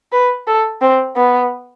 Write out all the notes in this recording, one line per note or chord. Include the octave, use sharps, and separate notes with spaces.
B4
A4
C4
B3